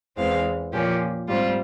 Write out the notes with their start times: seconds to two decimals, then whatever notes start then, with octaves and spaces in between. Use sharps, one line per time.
0.17 E2 E3 G#3 C4 F5
0.73 A#2 F3 A#3 C#4 G4
1.28 G#2 G3 C4 F4